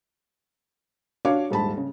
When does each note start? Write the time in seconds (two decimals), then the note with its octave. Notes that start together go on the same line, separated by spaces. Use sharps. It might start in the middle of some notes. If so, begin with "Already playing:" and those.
1.25 D4 F#4 C#5 F5 D6
1.50 D#1 G#2 A5 B5
1.77 C#3